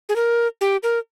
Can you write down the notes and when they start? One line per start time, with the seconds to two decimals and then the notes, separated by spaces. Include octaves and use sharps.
0.09 G#4
0.16 A#4
0.61 G4
0.83 A#4